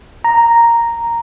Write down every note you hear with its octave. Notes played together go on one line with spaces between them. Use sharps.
A#5